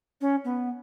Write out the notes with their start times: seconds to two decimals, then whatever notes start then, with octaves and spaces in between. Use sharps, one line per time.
0.21 C#4
0.45 B3